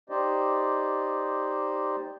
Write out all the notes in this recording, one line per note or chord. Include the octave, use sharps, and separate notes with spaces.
D#4 G4 C5 D5 D#5